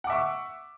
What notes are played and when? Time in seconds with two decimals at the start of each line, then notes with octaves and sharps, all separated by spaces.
0.04 F#5
0.07 D6
0.10 E5
0.13 C#6
0.15 E6